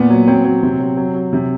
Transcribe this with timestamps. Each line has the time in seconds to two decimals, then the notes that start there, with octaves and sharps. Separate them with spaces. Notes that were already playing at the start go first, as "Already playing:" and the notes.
Already playing: A#2 B3
0.10 F#3
0.27 F#3 C4
0.45 F#3
0.63 C3 C4
0.80 F#3
0.97 F#3
1.14 F#3
1.33 C3